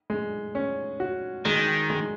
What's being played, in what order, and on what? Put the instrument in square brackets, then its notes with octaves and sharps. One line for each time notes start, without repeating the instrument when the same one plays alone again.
[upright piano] G#3
C#4
F#4
[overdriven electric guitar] D#3 [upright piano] G#3
[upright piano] G#3